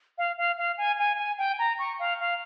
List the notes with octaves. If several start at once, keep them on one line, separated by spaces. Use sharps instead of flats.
F5
F5
F5
G#5
G#5
G#5
G5
A#5
C#6
F5
F5